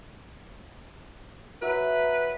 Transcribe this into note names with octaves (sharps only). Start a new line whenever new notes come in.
F#3 B4 E5 E6